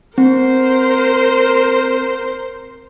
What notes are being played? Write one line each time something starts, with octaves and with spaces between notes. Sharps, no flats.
C4 A#4 C5